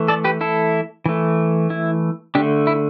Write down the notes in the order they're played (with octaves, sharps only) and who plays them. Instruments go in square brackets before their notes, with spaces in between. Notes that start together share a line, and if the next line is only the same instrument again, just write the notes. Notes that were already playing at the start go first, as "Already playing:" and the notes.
Already playing: [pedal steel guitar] E3 A3
A4 D5
G4 B4
E4 A4
E3 A3
E4
D3 A3 D4 G4
E4